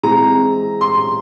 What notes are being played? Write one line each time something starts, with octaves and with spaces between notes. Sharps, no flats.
E3 G#3 C4 A#5
C6